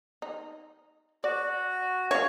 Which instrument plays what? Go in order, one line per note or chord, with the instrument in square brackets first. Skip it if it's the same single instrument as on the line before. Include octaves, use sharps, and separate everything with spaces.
[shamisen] D#4
[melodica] F#4 [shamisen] D5
[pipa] C#5 [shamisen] E5 F5